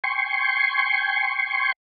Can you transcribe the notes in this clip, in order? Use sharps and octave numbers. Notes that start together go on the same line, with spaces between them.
G5 G#5 C6 C#6